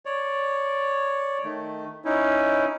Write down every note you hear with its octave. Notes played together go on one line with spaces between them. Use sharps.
C#5 D5
D#3 A3
C#4 D#4 E4